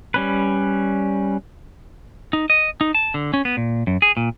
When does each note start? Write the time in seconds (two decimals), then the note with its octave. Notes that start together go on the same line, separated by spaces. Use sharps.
0.14 G3 C#4 B4
2.33 D#4
2.50 D#5
2.81 D#4
2.95 A5
3.14 D3
3.34 C#4
3.45 B3
3.57 A#2
3.87 F#2
4.02 G#4
4.17 A#2